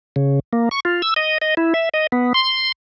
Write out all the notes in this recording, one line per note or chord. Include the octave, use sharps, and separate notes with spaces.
C#3
A#3
C#6
F4
E6
D#5
D#5
E4
E5
D#5
B3
C6